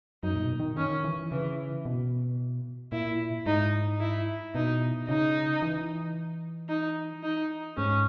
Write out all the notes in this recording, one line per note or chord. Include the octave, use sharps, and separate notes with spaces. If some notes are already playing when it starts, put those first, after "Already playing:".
F#2 D#4
A#2
B2
D#3
D#3 C#4
E3
C#3 E3
B2
A#2 E4
G#2 D#4
E4
B2 D#4
C#3 D#4
E3
D#4
D#4
G#2 C#4